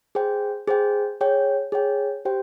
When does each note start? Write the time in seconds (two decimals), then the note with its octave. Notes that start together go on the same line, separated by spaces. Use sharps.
0.15 G#4 C5 G5
0.68 G#4 C5 G5
1.21 G#4 C#5 G5
1.72 G#4 C#5 G5
2.25 G4 C5 G5